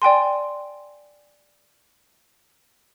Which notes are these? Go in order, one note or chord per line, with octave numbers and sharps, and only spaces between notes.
D5 G5 G#5 C6